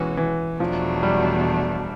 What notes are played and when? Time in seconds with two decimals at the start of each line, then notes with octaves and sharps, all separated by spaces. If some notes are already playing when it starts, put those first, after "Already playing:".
Already playing: B2 E3 G#3 C#4 F#4
0.17 E3
0.60 E2 B2 F3 F#3 A3 D4
1.03 G3